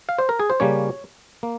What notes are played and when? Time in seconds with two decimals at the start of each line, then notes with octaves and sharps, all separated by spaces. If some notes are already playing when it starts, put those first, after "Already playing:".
0.09 F5
0.19 C5
0.29 A#4
0.40 G#4
0.50 C5
0.60 C#3 G3 A#3 C#4 C#5
1.43 A#3